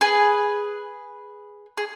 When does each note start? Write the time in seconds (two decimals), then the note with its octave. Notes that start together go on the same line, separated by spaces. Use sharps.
0.01 G#4 B4
1.77 G#4